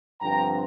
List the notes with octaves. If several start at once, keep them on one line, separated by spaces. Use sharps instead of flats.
G2 D3 F3 C4 G5 A#5